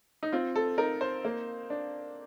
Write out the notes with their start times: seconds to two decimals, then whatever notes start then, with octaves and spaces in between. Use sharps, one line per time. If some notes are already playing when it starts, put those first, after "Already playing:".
0.23 D#4
0.32 C4 F4
0.56 A4
0.78 D#4 A#4
1.01 C5
1.25 A#3
1.70 D4